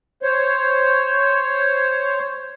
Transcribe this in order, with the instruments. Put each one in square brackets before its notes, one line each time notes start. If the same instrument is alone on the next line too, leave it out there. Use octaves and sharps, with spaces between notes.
[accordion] C5 C#5